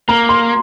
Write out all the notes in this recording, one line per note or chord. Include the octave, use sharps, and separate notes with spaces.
A#3 A#5
C6